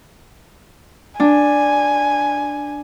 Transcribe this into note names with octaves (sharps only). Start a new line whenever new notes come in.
D4 G#5